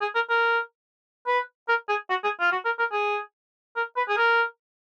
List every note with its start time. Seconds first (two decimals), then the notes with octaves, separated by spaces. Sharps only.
0.01 G#4
0.15 A#4
0.29 A#4
1.26 B4
1.68 A#4
1.88 G#4
2.10 F#4
2.24 G#4
2.40 F4
2.52 F#4
2.65 A#4
2.79 A#4
2.92 G#4
3.76 A#4
3.96 B4
4.09 G#4
4.17 A#4